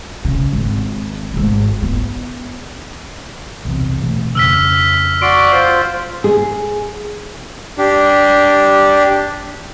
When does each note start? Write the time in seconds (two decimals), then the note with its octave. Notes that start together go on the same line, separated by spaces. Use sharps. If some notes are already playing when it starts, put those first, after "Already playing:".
0.25 C#3
0.52 G#1
1.34 G#1 G#2
1.82 B3
3.65 B1 E2 C3
4.01 B2 E3 A3
4.35 F2 C#3 E6 F6 B6
5.22 F#4 D5 C6 D7
5.52 F4 C5
6.24 G#4
7.78 D4 G4